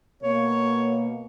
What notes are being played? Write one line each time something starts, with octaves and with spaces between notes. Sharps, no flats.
B2 A#3 C#5